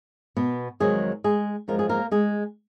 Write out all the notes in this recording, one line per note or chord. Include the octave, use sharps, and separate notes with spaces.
B2 B3
F2 D#3 F#3 G#3 G#4
G#3 G#4
F#2 F3 G#3 A#4
G#4
A#3 A#4
G#3 G#4